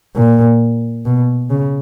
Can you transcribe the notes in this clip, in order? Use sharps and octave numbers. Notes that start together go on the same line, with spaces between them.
A#2
B2
C#3